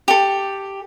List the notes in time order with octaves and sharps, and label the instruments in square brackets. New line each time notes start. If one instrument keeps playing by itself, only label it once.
[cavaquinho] G4 A4